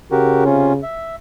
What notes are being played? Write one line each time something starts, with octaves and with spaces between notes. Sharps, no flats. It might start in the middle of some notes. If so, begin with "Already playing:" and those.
C#3 F#4 G4 A#4
C3 C#4 F4
E5